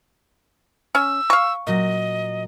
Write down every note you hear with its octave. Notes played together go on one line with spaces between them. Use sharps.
C#4 E6
F5 C#6
A#2 F#3 D#5 A#6